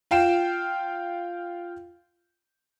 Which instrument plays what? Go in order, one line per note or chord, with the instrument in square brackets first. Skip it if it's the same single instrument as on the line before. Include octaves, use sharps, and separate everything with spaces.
[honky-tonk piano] F4 F5 G5 E7